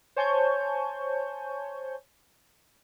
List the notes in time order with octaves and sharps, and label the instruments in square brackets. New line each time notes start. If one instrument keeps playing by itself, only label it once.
[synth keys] C5 C#5 G#5 A5 C#6 G6